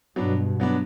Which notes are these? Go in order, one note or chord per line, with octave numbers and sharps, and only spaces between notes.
G2 B2 F#3 B3 D4
F#3 B3 D4